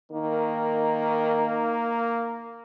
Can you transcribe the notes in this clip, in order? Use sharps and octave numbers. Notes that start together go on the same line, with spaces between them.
D#3 A#3